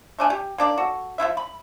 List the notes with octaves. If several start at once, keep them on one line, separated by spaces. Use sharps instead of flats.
A3 D4 G#5
G4
A#3 D4 D5
F#4 A4
F3 A3 E4 E5
B5